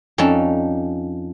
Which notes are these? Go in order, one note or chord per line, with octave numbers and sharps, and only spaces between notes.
F2 C#4 D#4 D5 A5